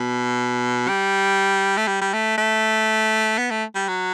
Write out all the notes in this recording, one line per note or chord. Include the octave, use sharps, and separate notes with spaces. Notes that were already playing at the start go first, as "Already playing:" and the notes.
Already playing: B2
G3
A3
G3
G3
A3
A3
B3
A3
G3
F#3